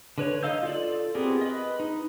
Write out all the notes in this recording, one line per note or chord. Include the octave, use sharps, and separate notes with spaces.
D3 B4 C#5
D#4 D#5 F5 E6 G6
F4 A4 D5
B3 C4 G4 G#4 A#4
B4 D#5
D#4